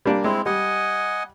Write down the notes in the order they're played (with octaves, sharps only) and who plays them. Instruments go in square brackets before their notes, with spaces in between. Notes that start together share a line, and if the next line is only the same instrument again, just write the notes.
[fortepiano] G3 A#3 D4
[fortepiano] G#3 [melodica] C4 E4
[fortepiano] G3 [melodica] D#5 F#5 G#5